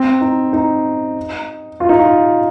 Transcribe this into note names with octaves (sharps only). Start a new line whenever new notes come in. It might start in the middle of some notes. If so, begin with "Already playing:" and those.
Already playing: C4
D#4
D#4
F4
D#4
F4